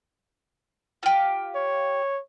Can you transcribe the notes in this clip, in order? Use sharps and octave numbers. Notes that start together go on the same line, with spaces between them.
F4 G4
C#5